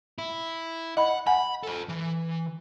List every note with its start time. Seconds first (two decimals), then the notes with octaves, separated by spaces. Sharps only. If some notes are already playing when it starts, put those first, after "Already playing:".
0.18 E4
0.97 D#5 F#5 B5
1.27 F#5 G#5 B5
1.63 A4 C5
1.89 E3